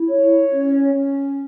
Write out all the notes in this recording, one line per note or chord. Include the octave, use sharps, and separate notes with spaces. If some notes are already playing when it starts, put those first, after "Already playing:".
Already playing: E4
C#5
C#4
C#4